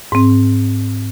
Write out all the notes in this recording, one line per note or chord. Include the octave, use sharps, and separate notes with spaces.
G#2 C4